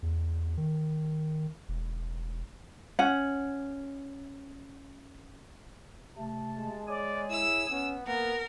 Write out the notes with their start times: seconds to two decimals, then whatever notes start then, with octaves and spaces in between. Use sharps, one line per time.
0.03 E2
0.57 D#3
1.69 E1
2.99 C#4 F#5
6.18 C3 A3 A5
6.56 G#3
6.88 G#4 C#5 D5 G#5
7.31 E4 E6
7.70 B3 C#4
8.07 A#3 B3 A#4 F#5